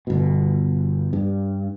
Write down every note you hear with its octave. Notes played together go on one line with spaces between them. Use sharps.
G1 B2
G2